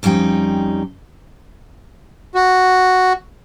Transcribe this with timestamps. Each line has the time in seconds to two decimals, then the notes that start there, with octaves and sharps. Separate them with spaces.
0.03 F2 G3 C#4 D#4 G5
2.35 F#4